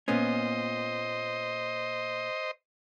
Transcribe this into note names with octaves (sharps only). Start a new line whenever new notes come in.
A#2 B3 C#4 C5 D#5